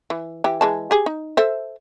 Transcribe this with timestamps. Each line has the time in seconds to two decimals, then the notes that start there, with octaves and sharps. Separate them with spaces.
0.10 E3
0.44 E3 G4
0.61 E3 G#3 A5
0.91 G4 G#4
1.06 D#4
1.37 A4 C5 E5